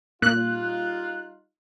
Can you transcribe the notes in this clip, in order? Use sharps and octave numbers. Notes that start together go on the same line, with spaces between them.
A#2 G3 D#4 F4 F#6